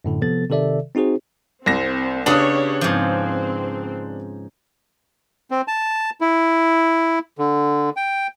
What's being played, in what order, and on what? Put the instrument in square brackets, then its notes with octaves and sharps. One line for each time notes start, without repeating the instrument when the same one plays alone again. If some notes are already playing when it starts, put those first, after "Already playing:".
[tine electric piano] F#2 A2 D3
C3 F3 B3 A4 A6
C3 D#3 A4 D5 E5
C4 D#4 F#4 G#4 C5
[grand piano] C2 A#6 [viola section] C4
[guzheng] C#3 B3 [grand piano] D4 D#6 [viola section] G4 C#5
[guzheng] G#2 F3 [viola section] C4
[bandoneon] C4
A5
E4
D3
G5